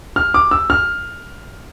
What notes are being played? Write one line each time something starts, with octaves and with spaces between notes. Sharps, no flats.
F6
D6
E6
F6